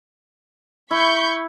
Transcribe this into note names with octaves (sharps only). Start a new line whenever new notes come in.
E4 B5 C#6 G6